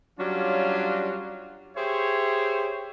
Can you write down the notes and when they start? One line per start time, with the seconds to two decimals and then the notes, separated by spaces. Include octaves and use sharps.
0.19 F#3 G3 C#4 D4 F4
1.77 G4 G#4 C5 C#5 E5